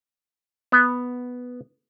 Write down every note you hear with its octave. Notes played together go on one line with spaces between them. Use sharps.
B3